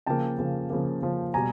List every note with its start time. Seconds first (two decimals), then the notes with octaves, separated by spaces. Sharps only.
0.06 C#3 F3 A#3 G5 A5
0.38 C#3 F3 A#3
0.70 C#3 F3 A#3
1.02 C#3 F3 A#3
1.34 B2 G3 G#5 A#5